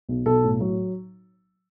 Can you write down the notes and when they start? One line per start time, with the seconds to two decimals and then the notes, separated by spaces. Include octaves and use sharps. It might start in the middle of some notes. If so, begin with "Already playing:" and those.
0.09 B1
0.26 B1 A4
0.44 A2
0.60 F#3